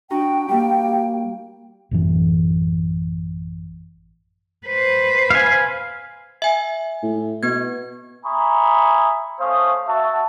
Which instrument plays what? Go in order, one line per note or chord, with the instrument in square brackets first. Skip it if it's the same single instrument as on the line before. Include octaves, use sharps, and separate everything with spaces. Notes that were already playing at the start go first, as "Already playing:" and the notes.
[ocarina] D4 [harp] D#4 F#4 [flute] G5
[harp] G3 A#3 [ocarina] G4
[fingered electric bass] A1 F#2 E3
[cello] B4 C5
[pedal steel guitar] F5 G#5
[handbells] E5 G#5
[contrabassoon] A2
[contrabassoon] B2 [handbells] B3 G#6
[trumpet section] E5 G#5 A#5 B5 C#6 D#6
A3 C#4 C5 F5 D#6
F#4 E5 A5